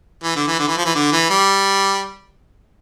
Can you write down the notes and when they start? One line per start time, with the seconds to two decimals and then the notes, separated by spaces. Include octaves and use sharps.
0.24 E3
0.35 D3
0.48 E3
0.59 D3
0.68 E3
0.77 F3
0.86 E3
0.95 D3
1.12 E3
1.30 G3